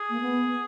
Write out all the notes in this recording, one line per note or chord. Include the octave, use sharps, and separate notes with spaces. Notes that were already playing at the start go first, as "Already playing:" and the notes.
Already playing: G#4
A#3
B3